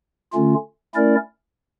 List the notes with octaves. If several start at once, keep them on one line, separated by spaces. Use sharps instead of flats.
D3 A3 C#4 F4
A3 C#4 E4 A#4 D5